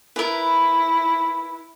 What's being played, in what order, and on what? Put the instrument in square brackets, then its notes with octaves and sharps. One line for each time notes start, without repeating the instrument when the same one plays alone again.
[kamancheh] E4 [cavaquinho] A#4 B4